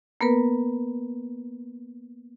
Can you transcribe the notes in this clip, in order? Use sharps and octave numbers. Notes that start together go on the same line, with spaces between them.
A#3 B3 A#4 B4